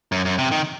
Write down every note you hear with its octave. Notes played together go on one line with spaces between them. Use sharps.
F#2
F#2
C3
D#3